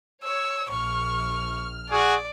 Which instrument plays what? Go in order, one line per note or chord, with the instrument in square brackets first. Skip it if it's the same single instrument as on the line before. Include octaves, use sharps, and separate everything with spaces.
[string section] C#5 [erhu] E6
[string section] A#1 F6 [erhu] C#6
[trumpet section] F#4 G#4 [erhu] D5